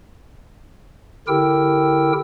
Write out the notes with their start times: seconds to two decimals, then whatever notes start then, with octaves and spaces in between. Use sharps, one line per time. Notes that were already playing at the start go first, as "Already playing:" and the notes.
1.28 D3 E4 G4 A#4 G5 E6